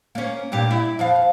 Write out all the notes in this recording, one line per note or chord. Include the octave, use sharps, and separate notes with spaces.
A#3 C#4
G2 A#2 G4
E4
F2 F3 F5